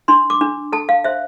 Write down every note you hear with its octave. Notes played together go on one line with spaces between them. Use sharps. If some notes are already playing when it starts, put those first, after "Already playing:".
D4 C6
D6
D4
A4 A5
F5
C5 E5